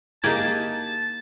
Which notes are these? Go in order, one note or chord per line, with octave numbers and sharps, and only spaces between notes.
A#3 D#4 E4 G4 G#4 A5 G#6